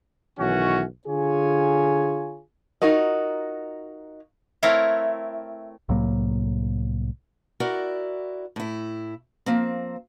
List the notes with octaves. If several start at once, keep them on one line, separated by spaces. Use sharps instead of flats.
B1 D#3 E3 C#4 F#4
D3 F4 G#4 C#5 G#5
D#4 F4 F#4 A#4 D#5
A3 C4 E4 A#4 C#5 F5
C2 A2 F#3 A#3
E4 F#4 A#4 D5
A2 E4
F3 A#3 C4